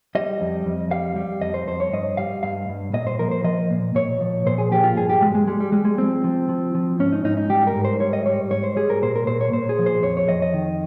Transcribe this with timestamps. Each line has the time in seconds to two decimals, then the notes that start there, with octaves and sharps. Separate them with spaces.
0.15 G3 D#5
0.41 F2
0.66 F2
0.91 G3 F5
1.16 G3
1.41 F2 D#5
1.54 C5
1.67 F2 C5
1.80 C#5
1.93 G2 D#5
2.17 G3 F5
2.43 G2 F5
2.69 G2
2.93 A#2 D#5
3.07 C5
3.19 F3 A#4
3.31 C5
3.44 F3 D#5
3.70 A#2
3.95 A#2 C#5
4.21 F3
4.46 A#2 C5
4.58 G#4
4.71 F3 G4
4.84 F4
4.97 G2 G#4
5.09 G4
5.21 G2 G#3
5.35 G#3
5.48 G3 G#3
5.60 G3
5.72 G3 G#3
5.85 G#3
5.98 F3 C4
6.24 F3
6.49 F3
6.75 F3
6.99 G#2 C#4
7.12 D#4
7.24 G#2 D#4
7.37 D#4
7.50 G3 G4
7.67 A#4
7.76 G#2
7.85 C5
8.00 G3 C#5
8.13 D#5
8.26 G3 C#5
8.51 G#2 C#5
8.64 C5
8.76 G3 G#4
8.90 A#4
9.02 A#2 C5
9.16 A#4
9.27 A#2 C5
9.41 C#5
9.53 A#2 C5
9.69 G#4
9.79 F3
9.86 C5
10.03 F2 C#5
10.17 C#5
10.29 F2 D#5
10.42 D#5
10.54 D#3